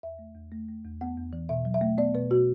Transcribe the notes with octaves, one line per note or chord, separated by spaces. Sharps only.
E2 E5
A3
E2
A3
A3
E2
B3 F#5
E2
E3
B2 E5
F#3
E5
A3
B3 D5
B2 B4
B2 F#4